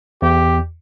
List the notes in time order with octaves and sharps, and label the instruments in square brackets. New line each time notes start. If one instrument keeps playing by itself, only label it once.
[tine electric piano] E2 [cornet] G4